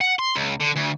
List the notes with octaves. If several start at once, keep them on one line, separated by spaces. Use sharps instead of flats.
F#5
C6
C#2
D3
D2